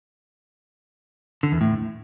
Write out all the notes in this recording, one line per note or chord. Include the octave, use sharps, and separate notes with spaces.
D3
E2
A2